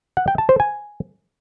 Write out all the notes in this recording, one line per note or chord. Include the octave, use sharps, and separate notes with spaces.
F#5
G5
A5
C5
G#5